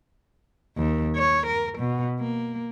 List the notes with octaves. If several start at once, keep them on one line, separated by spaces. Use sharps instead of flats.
D#2
C#5
A#4
B2
A#3